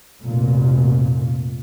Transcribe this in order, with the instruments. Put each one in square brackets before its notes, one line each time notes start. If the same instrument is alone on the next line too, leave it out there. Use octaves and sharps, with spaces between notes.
[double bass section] F1 A#2